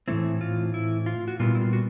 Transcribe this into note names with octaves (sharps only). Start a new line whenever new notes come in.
A2 E3 A3 C4 E4
F4
E4
F4
F#4
A#2 G3 B3 E4 F4
E4
F4
F#4